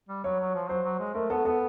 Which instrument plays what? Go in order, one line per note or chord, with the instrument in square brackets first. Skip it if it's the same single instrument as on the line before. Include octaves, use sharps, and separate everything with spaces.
[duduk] G3
[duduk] F#3 [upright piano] C#5
[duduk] F#3
F3
[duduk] F#3 [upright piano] C5
[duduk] F#3
G#3
[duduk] A3 [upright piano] A#4
[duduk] B3 [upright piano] A4
[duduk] B3 [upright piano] A4